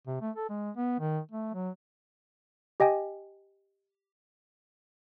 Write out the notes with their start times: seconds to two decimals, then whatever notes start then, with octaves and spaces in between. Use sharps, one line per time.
0.07 C3
0.21 A3
0.36 A4
0.50 G#3
0.76 B3
1.00 D#3
1.32 A3
1.54 F#3
2.80 G4 D#5 G5 G#5